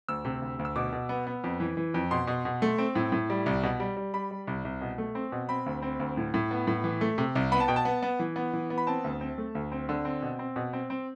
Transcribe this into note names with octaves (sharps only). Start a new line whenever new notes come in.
D2 E6
C3
D2
D2
E6
B2 D6
B2
B3
B3
F2
E3
E3
F2
B2 C6
B2
B2
A3
C4
A2
A2
G3
C2
B2
G3
G3
G3 B5
G3
C2
C2
B2
A3
C4
B2
C4 B5
D2
C4
D2
A2
A2
B3
A2
E3
A3
C3
C2
B3 B5
A5
B2 G5
A5
B3
B3
E3
B3
E3
B3
B5
C4 A5
D2
C4
A3
D2
C4
D3
C4
B2
C4
B2
C4
C4